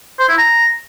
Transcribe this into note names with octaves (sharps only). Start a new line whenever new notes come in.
C5
E4
A#5